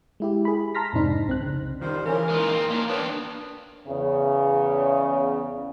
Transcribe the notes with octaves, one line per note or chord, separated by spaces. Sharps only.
G#3 E4 G4
G#4 B5
A5 A#5 C6 F6 A#6 B6
F2 G#2 C3 C4 D4 D#4
C2 C4 F#6
C#3
D#3 F3 G3 C5
C#3 E3 C#4 A#4
A#2 G#3 D#4 F4
F3 C4
A#3 C#4 D4 F4
B3 D4 A#4 C#5 G5 A5
E2 C#3